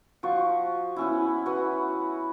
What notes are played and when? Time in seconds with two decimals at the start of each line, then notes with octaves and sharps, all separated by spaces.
0.23 F3 F#4 C#6
0.96 B3 C#4 E4
1.46 F#4 B4